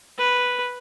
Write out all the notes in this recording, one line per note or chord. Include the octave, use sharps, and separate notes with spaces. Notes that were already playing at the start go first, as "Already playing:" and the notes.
B4